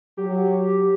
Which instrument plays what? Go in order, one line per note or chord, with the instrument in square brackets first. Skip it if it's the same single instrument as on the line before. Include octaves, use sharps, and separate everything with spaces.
[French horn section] F#3 [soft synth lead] G4